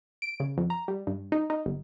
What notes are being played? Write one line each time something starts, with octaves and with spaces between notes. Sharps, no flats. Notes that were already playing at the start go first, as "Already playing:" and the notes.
D7
C#3
F2
A#5
G3
G2
D#4
D#4
G1